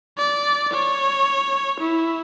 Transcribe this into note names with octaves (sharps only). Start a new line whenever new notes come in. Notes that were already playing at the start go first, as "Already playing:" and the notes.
D5
C#5
E4